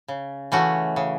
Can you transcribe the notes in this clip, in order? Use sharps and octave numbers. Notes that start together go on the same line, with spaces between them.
C#3
E3 A3 C#4 F#4
C#3